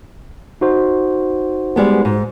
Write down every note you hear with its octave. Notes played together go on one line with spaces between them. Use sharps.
D#4 F#4 C5
G3 G#3 B3
G#2